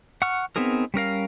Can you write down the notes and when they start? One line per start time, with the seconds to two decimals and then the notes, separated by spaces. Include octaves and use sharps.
0.22 F#5 C#6 F6
0.56 B3 C4 D#4 G#4 A#4
0.94 G3 C#4 A#4 F5